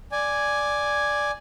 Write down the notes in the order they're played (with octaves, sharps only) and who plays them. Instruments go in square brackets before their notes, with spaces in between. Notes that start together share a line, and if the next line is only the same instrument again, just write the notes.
[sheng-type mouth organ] D5 G#5